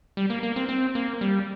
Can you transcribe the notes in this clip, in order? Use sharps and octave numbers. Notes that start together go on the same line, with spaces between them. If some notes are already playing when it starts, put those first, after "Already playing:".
G3
A#3
A#3
C4
C4
A#3
G3